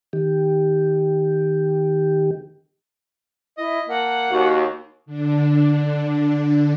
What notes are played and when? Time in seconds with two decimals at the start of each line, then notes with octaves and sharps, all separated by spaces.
0.13 D#3 G4
3.58 E4 D#5
3.89 A#3 F#5 A5
4.30 D#2 F#4
5.06 D3 D4